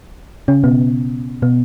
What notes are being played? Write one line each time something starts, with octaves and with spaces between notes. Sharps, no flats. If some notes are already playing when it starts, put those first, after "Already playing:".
C#3 C#4
B2 B3
B2 B3